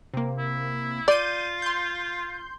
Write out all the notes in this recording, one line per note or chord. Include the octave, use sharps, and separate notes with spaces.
C3 A#3
E4
F4 D5 G6 D#7
C6 G6